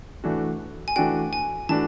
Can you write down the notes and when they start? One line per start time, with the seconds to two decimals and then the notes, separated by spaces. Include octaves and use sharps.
0.24 E3 A3 D4 F#4
0.88 G#5
0.96 E3 A3 D4 F#4 G5
1.33 G#5
1.69 E3 A3 D4 F#4 A5